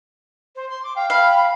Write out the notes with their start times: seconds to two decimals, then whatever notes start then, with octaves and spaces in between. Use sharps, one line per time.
0.56 C5
0.70 C6
0.83 D6
0.96 F5 G5
1.10 F5 B5